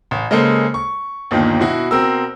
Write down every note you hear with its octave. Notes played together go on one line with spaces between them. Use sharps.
A1
C#3 G#3 A#3 A4 C5
C#6
G1 D#2 A#2 D#3
B2 E4 F#4
B2 C4 A#4 E6